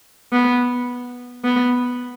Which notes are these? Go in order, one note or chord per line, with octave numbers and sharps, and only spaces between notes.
B3
B3